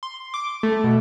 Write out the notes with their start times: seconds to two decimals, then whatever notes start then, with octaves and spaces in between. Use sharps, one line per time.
0.03 C6
0.34 D6
0.63 A3
0.84 B2